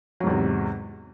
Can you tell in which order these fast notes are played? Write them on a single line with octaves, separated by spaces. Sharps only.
F#3 G#2 E2 C3